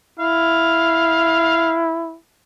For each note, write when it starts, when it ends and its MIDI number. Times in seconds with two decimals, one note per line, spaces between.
0.19 2.17 64
0.19 1.83 77